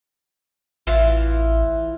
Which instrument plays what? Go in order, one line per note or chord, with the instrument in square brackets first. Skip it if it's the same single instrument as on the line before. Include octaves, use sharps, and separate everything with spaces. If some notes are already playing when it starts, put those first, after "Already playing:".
[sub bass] A1 [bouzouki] E3 F4